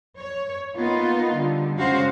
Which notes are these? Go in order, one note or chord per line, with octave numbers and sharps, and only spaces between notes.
C#5
A#3 B3 D#4 F4
D3 G3
C#3 G#3 F#4 C5 F5